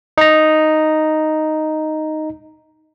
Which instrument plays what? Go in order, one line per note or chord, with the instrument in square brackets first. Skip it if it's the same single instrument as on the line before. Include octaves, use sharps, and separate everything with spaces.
[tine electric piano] D#4 A#5